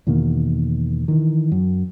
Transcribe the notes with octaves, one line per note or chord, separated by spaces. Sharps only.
E2 B2 D#3 A#3
D#3 E3
F#2